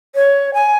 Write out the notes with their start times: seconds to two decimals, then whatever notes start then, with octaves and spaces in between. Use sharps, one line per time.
0.15 C#5
0.54 G#5